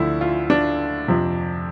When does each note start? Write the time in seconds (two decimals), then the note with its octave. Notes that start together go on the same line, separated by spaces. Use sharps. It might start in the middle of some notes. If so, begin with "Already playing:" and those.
Already playing: D2 D3 F3 E4
0.21 F4
0.50 D4
1.08 F2 C3 F3